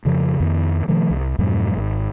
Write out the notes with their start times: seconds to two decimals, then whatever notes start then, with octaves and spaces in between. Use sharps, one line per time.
0.05 F2 C#3 F3
0.40 F2 D#3 B3
0.88 B2 D#3 F3 A3
1.10 C2
1.39 F2 G#2 B2 F#3
1.77 G#1